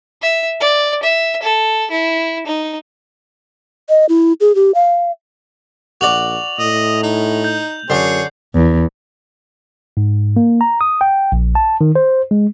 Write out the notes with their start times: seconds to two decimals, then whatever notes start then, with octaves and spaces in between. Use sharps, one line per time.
0.22 E5
0.60 D5
1.03 E5
1.42 A4
1.91 E4
2.46 D#4
3.89 D#5
4.09 E4
4.41 G#4
4.55 G4
4.75 F5
6.01 A#1 F#4 D5 F7 F#7
6.59 A2 D#5
7.03 D#4
7.44 G6
7.90 F#2 D3 G#4 C#5 C7
8.55 E2
9.97 G#2
10.37 A#3
10.61 A#5
10.81 D#6
11.01 G5
11.32 A#1
11.55 A5
11.81 D#3
11.96 C5
12.31 G#3